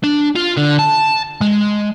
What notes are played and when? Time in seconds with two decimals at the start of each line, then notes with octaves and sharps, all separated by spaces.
0.04 D4
0.35 F4
0.57 D3
0.79 A5
1.41 G#3